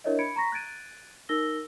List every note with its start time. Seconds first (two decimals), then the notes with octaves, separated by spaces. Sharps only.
0.04 D4 E4 A#4 C#5 D#5 E5
0.19 B5 G#6 C#7 D7
0.36 A#5 C#6 A#6 B6
0.52 F#6 G#6 A6 D7 D#7
1.29 D#4 A#4 E6 A#6 G7